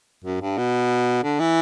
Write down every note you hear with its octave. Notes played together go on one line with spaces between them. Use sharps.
F#2
G2
B2
D3
E3